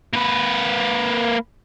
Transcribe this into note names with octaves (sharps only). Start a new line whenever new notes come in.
A#3 B4